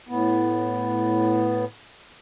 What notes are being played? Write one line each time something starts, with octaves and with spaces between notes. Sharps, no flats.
A2 B3